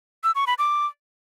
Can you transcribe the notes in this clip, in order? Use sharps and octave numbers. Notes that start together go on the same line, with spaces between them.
E6
C#6
B5
D6